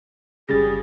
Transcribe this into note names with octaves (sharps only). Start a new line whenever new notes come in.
G1 C#3 G3 G#4 A6 A#6